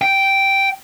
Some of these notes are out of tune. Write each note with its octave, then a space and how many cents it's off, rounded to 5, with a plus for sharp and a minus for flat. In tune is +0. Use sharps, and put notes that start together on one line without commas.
G5 -5